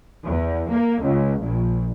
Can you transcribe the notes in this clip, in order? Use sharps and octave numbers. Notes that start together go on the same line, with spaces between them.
E2
A#3
C#2
A#1